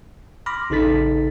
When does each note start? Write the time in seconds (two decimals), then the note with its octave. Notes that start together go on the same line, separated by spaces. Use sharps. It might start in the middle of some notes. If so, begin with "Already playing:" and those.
0.46 B5 C6 D6 F6 A#6
0.70 A1 C#3 D#4 A4 A6 B6